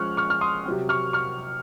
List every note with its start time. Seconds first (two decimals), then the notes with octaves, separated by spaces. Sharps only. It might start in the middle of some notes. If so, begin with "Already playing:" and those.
Already playing: F3 G#3 C#4 C#6 F6 F#6
0.17 C#6 F6
0.30 F6
0.41 C6 D#6
0.66 C3 F#3 C4
0.89 C#6 F6
1.13 C#6 F6